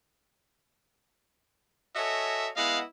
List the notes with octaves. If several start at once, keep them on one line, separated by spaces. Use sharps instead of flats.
F#4 A4 C#5 D#5 E5 G#5
G#3 B3 E4 D#5 F5 F#5